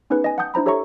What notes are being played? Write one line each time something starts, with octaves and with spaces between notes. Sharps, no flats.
B3 C#4 D#4 G#4 B4
D#5 G#5
F#5 G5 A5 D#6 G6
D4 E4 C5 A#5 B5
G4 A4 C#5 E5 A#5 C#6